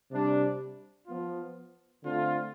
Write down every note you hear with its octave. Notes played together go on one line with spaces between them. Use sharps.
C3 G3 D4
F3 B3 F4
D3 A3 C4 F4